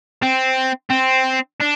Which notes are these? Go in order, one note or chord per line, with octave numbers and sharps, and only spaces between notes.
C4
C4
D4